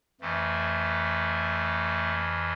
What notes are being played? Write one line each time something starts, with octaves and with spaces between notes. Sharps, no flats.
F2 E3 A3